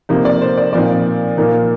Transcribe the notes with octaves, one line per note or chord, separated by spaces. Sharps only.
C3 F3 A#3 D#4
D5
C5
D5
A#2 F3 C4 D#4 D5
A#2 F3 A#3 D#4